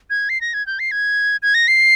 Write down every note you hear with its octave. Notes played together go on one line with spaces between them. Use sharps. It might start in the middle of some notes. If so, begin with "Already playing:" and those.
G#6
C7
A#6
G#6
G6
C7
G#6
G#6
A#6
C7